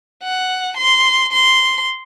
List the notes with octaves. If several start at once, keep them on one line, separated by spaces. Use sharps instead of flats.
F#5
C6
C6